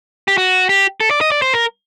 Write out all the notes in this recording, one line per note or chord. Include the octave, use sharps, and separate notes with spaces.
G4
F#4
G4
A4
D5
D#5
D5
C5
A#4